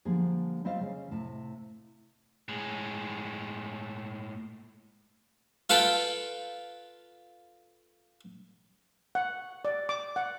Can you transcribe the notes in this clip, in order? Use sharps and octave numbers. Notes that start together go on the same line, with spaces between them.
D3 F3 G3 A#3 G#4
G3 C4 F4 C5 D#5 F5
C#3
A2 C3 A5
A2 G#3
F4 A4 B4 G5
F#5
D5
D6
F#5